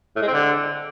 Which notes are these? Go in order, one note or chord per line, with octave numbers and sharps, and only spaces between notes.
A2
G#3
C4
D3